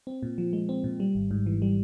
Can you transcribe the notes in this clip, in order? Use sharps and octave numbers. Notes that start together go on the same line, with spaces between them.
C4
A#2
F3
G#3
C4
A#2
G3
G#1
G#2
E3
G3